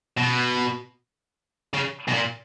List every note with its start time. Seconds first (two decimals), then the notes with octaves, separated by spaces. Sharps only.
0.17 B2
1.74 C#3
2.08 B2
2.14 A#2